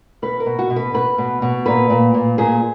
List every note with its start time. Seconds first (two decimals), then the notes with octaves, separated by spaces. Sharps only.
0.22 B2 B4
0.40 A#4
0.46 B2
0.59 F#4
0.70 B2
0.76 B4
0.94 B2 B4
1.18 B2
1.42 B2
1.66 A#2 B4
1.90 A#2
2.14 A#2
2.38 A#2 G#4